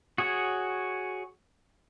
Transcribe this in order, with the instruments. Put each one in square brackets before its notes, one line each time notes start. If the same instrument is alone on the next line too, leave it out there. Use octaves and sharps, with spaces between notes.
[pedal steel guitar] F#4 G#4 C#5